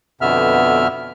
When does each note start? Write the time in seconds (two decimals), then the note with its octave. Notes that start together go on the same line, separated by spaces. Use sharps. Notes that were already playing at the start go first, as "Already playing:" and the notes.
0.21 F2 B2 D3 B3 E5 F6